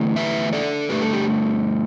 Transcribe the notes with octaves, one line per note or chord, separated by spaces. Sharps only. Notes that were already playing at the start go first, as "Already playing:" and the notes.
Already playing: E2 D3 A3 E4
B4 E5
A4 D5
G2 D3 A3 G4 B4
A4
G4